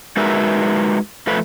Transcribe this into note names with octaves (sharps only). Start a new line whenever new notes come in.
G#3 D#4 F#4 A#4 B4 E5
F2 F3 A3 B4